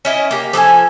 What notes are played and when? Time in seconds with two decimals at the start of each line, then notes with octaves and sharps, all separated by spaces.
0.05 C#4 E4 D#5
0.31 A#3 G4
0.53 F3 A4 C5 G#5